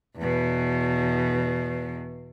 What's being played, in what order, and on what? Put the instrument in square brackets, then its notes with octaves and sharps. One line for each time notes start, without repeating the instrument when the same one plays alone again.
[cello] E2 B2